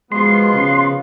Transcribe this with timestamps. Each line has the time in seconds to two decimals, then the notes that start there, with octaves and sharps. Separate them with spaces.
0.12 B2 F3 G#3 B3 C6
0.54 C#3